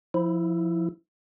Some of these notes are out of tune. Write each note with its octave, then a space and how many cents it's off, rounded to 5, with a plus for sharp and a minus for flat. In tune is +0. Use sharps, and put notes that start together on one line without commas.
F3 +0 E4 +0